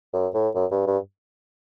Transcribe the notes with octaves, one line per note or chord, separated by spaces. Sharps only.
F#2
A2
F#2
G2
G2